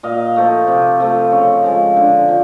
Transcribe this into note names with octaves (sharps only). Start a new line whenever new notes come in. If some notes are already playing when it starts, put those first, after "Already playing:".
A#2 D#5 F5
F3 A3
C3
F3 A3
C#3 C#5 D#5
F3 G#3
D3
F3